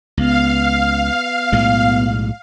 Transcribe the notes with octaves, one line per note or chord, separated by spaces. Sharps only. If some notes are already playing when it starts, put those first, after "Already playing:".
C#2 B3 F5
B1 A2 G#3